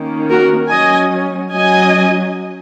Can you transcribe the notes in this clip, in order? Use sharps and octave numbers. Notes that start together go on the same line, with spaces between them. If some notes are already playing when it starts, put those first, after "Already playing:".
Already playing: D#3 A#3 C#4
F#4 A#4
F#3 C#4 D#5 G#5
F#3 C#4 D#5 G#5